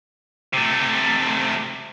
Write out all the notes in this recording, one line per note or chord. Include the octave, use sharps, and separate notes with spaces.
C3 A3